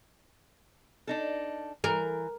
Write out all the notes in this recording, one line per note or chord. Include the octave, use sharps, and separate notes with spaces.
D4 D#4 A4
E3 A#4